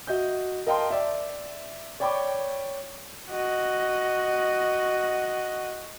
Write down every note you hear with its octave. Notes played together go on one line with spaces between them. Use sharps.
F#4 D#5 E5 G6
A#4 D#5 F5 G5 A5 C6
D5 E5
C#5 D5 G5 B5 C#6 D6
F#4 D#5